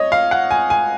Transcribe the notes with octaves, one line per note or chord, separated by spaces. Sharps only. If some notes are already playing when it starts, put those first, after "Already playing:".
Already playing: C#5 D#5
F5
F#5
G#5
G#5